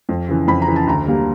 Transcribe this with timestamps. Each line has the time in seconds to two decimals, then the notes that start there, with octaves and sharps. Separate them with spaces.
0.09 F2
0.28 C#3 E3
0.47 F2 B5
0.62 A#5
0.67 C#3 E3
0.76 A5
0.87 D2 A#5
1.07 D3 G3 A#3